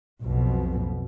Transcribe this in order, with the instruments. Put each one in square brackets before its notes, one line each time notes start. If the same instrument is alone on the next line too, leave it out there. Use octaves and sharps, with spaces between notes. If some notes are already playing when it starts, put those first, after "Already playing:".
[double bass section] B1 F2 B2